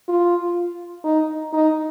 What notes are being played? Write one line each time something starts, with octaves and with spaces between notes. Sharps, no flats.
F4
D#4
D#4